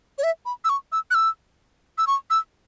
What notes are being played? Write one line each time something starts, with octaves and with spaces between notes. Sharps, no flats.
C#5
E5
B5
E6
C#6
E6
F#6
E6
E6
C#6
E6